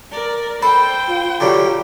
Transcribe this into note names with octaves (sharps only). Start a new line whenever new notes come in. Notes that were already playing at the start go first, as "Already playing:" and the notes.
A#4 D5
A4 C5 G5 B5
F4
D3 F#3 G3